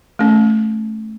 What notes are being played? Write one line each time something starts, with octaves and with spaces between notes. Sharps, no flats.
A3 C#4